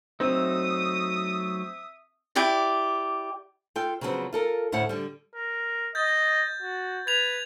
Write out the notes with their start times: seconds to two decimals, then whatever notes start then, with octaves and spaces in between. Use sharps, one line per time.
0.20 F#3 A3 C4 D#4 E5 D#6
2.35 E4 G4 D5
3.76 F4 A4 G5
4.01 C#3 F3 F#3 G#3 B3 C4
4.33 F4 A4 A#4
4.72 D2 A2 C5 E5 F#5
4.89 D3 G3
5.35 A#4
5.95 D#5 G6 A6
6.62 F#4
7.07 B4 G#6 F7